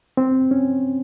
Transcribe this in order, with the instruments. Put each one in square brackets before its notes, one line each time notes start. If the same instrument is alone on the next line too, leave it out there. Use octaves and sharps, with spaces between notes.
[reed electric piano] C4
C#4